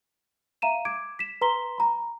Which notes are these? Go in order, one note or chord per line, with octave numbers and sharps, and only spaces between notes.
E5 F5 A#5 D#7 E7
D6 G#6 D7
B6 E7
B4 A#5 C6 B6 G7
A#5 B5